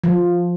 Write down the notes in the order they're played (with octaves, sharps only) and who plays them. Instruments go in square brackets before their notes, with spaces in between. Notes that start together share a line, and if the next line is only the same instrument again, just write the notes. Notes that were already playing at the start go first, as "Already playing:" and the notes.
[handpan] F3